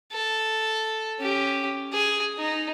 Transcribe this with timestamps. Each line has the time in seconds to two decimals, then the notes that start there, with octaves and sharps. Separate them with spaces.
0.12 A4
1.19 C#4 G4
1.92 G#4
2.39 D#4